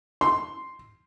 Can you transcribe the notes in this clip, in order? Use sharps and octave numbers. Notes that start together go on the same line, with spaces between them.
C6